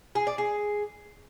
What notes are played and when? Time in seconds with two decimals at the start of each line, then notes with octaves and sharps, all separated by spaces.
0.15 G#4
0.27 D5
0.38 G#4